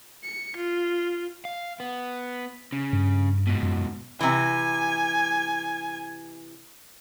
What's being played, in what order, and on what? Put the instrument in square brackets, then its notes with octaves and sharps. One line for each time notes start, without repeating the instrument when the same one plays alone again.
[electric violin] C#7
F4
[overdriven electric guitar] F5
B3
C#3
[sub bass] G2
[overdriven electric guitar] G#2 B2
[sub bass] F#2
[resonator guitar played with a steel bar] C3 E3 [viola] G#5